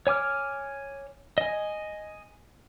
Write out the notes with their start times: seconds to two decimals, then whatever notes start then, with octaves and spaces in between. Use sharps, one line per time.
0.07 C#5 G#5 D6 F6
1.38 D#5 G#5